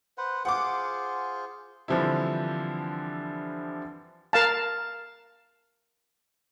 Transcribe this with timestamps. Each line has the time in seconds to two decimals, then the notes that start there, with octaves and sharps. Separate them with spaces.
0.18 B4 C5 F#5
0.45 F4 G#4 C5 F#5 D6
1.88 D3 E3 F3 G3 C4 E4
4.33 A#4 F5 A5